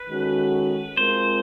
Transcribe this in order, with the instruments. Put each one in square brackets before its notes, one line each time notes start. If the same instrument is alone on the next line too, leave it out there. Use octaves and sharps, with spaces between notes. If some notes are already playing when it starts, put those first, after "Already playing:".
Already playing: [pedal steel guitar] B4
[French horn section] D#3 G#3 C#4 F#4 A4
[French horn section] G#3 C4 F4 A#4 [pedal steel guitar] C5